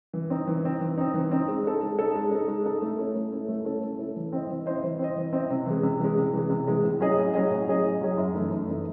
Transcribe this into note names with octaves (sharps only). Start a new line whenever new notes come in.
E3
C4 D#4
E3
C4 D#4
E3
C4 D#4
E3
C4 D#4
G#3
D#4 A4
G#3
D#4 A4
G#3
D#4 A4
G#3
D#4 A4
A3
C#4 E4 A4
A3
C#4 E4 A4
A3
C#4 E4 A4
A3
C#4 E4 A4
E3
C4 E4 C5 D#5
E3
C4 E4 C5 D#5
E3
C4 E4 C5 D#5
E3
C4 E4 C5 D#5
C3
E3 G#3
C3
E3 G#3
C3
E3 G#3
C3
E3 G#3
A2
F#3 C#4 G#4 D#5
A2
F#3 C#4 G#4 D#5
A2
F#3 C#4 G#4 D#5
A2
F#3 C#4 G#4 D#5
F#2
E3 A3 D#4
F#2
E3 A3 D#4